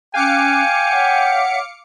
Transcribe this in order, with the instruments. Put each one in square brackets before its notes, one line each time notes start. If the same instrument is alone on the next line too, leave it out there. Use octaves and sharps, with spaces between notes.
[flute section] C#4 F#6 [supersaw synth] F5 D6 C#7 [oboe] G5 [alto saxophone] G#5
[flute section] C#5 E5 F#5